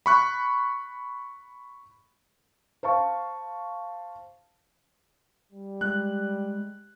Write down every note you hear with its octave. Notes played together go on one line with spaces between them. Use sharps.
B5 C#6 F#6
C5 F5 A5 C#6
G3
G#3 F#6